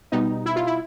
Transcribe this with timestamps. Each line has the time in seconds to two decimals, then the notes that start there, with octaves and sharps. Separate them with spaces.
0.12 B2 G3 B3 D#4
0.46 E4
0.56 F4
0.67 E4